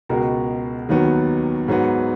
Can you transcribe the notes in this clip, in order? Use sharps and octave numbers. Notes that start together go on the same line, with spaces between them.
C#2 B2 G#3 F#4 A#4
D#2 D#3 F#3 B3
G#2 F#3 B3